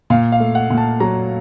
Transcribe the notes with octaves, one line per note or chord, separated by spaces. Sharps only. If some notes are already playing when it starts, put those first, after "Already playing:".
A#2 F5
F5
A3
F#5
A#2
A5
F#3 A#5